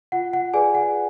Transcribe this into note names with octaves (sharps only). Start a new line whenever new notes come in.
F4 F#5
F#5
G#4 B4 D5 G#5
F#5